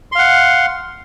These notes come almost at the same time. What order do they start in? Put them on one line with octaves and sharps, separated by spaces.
C6 F5 F#5